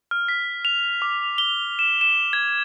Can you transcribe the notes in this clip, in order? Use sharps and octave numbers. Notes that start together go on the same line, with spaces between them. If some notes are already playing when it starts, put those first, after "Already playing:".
F6
B6
F7
D6
G7
E7
E7
G#6